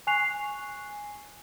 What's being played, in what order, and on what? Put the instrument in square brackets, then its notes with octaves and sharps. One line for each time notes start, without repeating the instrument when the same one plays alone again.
[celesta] G#5 C#6 F#6 C7 F7